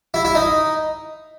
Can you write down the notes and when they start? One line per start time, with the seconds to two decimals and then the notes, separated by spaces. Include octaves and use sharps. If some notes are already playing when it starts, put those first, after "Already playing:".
0.14 E4
0.25 E4
0.35 D#4